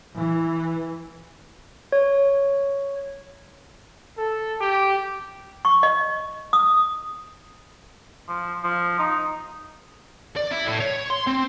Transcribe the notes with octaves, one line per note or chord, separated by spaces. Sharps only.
E3
C#5
A4
G4
C#6
D#5
D#6
F3
F3
D#4
D5
E4
A2
C#5
C6
C4